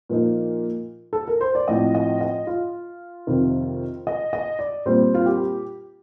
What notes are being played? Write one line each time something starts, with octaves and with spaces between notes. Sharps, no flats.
A#2 F3 A#3 D#4
A4
A#4
C5
D5
A2 F3 C4 D#5
D#5
D#5
F4
F2 C3 D#3
D#5
D#5
D5
A#2 G3 C4 C5
F4
G4